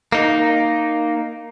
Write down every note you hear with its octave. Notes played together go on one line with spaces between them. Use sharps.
A#3 D#4